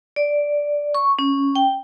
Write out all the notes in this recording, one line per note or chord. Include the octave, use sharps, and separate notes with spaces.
D5
C#6
C#4
G5